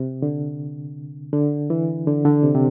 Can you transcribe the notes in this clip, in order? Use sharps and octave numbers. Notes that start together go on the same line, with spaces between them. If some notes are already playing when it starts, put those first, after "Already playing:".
Already playing: C3
D3
D3
E3
D3
D3
C3
C3